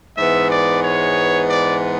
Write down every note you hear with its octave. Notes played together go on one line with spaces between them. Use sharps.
G#2 E3 G#3 B3 E5
D5
C#5
D5